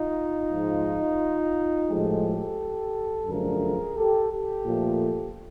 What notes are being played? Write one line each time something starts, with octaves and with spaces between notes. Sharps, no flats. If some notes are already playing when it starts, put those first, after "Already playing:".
Already playing: D#4 F4
G#2 F3 G#3
A2 F3 G#3 G4 A4
F#2 D3 F3 A3 G#4 A#4
G4 A4
G4 A4
A#2 F3 A3